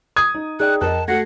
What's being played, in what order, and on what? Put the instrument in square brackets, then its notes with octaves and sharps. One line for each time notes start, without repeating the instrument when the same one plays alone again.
[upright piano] D#6 G#6
[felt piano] D#4
[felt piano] D#4 [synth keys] G#4 D5 G5 [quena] F#6
[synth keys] F2 G5 F#6 [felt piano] A#4 D#5 [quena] A5
[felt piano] A3 F#4 A4 [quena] F#5 [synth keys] G#6 A#6 C7